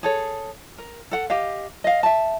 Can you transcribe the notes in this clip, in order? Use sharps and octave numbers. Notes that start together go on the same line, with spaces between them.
G#4 A4 C#5
A#4
A4 F#5
G4 D#5 F5
D#5 F5
E5 A5